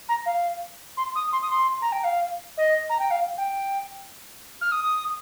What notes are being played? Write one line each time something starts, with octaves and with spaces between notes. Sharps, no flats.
A#5
F5
C6
D#6
C6
D#6
C6
A#5
G5
F5
D#5
A#5
G5
F5
G5
F6
D#6